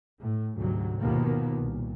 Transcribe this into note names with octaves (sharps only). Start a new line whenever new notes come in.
A2
D2 G#2 C3 F#3
D#2 B2 D#3 F3 A#3 B3
C2 A#2